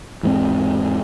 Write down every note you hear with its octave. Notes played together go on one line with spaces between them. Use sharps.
E2 G#2 C4